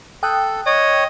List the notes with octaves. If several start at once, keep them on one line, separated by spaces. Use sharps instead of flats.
A4 G5 D#6 F#6
C#5 D#5